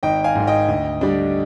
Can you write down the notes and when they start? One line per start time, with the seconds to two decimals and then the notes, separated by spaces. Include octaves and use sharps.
0.03 G#1 D#5 G5
0.24 F5 G#5
0.35 G#2 D#3
0.47 D#5 G5
0.68 D2
1.01 D3 G3 D4